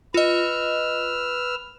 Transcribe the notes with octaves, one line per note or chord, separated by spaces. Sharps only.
F4 B4 D#5 E6 F6